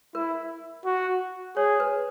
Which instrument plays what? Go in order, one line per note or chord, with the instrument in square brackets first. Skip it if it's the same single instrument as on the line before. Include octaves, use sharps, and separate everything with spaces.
[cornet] E4 [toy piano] A#4
[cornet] F#4
[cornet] G#4 [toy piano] C#5
[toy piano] B4